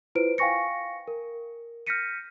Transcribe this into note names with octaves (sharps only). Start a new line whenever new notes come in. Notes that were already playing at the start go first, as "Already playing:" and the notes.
E4 F4 B4 C5 D7
F5 G5 G#5 C#6 A#6 C#7
A#4
F6 G6 A#6 B6 C#7 D#7